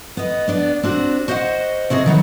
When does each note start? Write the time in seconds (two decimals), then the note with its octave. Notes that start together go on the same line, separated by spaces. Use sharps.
0.17 B3 D#5
0.48 B3 D4 D5
0.83 C4 D4 F#4
1.28 F#4 C5 D#5 E5 F#5
1.90 C3 F#4 G#4 D#5
2.06 D#3 F#3 B3